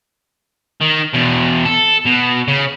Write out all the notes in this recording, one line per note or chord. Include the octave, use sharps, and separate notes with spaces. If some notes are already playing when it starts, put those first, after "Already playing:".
D#3
E2 B2
A4
B2
C#3